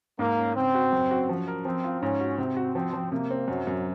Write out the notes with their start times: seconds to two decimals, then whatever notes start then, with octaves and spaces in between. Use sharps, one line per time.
0.19 G#2 A#3
0.38 C#4
0.56 C#3 C4
0.74 F#4
0.93 F#2
1.11 F#4
1.29 F3
1.48 A#4
1.65 F3 C4
1.84 F4
2.02 G#2 C#4
2.20 F#4
2.38 C3 C4
2.56 F#4
2.75 F3 C4
2.93 F3
3.12 C3 A#3
3.31 C4
3.48 F#2 F#3
3.67 F#2